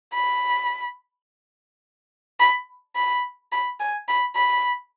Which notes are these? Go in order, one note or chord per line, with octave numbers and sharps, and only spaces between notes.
B5
B5
B5
B5
G#5
B5
B5